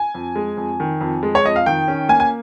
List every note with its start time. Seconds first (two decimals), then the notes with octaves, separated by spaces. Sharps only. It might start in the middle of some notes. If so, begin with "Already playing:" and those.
Already playing: G#5
0.15 F2
0.36 G#3
0.57 F2
0.80 D#3
1.01 F2
1.23 G#3
1.35 C#5
1.45 F2 D#5
1.56 F5
1.66 D#3 G5
1.88 C#4
2.09 A#3 G#5
2.20 G#5